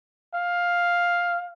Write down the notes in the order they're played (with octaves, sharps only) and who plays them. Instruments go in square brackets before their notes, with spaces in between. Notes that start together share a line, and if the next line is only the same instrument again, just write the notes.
[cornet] F5